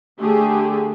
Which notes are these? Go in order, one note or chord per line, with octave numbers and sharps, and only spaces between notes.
D3 A3 G4 G#4